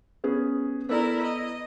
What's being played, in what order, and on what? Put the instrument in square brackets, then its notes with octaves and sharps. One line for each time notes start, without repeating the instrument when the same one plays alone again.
[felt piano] B3 C#4 G#4
[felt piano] B3 A4 D5 [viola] E4 A#4
[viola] D#5